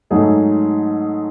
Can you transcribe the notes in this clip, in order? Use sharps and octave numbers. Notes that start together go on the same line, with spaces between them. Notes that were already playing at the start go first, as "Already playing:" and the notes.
G#2 F#3 A3 D#4 G#4